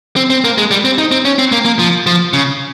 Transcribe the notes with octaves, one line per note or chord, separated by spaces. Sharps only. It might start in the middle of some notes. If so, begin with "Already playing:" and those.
C4
C4
A#3
G#3
G3
C4
D#4
C4
C#4
C4
A#3
A#3
F3
F3
C#3